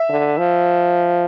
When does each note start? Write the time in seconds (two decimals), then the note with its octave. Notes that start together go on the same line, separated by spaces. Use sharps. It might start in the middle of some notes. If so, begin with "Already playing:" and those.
Already playing: E5
0.09 D3
0.38 F3